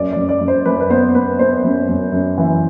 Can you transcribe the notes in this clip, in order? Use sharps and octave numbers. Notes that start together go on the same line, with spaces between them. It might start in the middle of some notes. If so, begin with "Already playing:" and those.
Already playing: F#2 D5
D5
F#2
D5
F#2
C5
F#2 B4
B4
B3 C5
B3 B4
B3 C5
F#2
F#2
F#2
E3